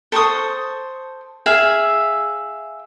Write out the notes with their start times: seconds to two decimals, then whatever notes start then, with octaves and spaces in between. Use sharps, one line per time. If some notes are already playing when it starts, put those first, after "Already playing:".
0.12 A4 C5 C#6 D#6
1.46 G#4 E5 F5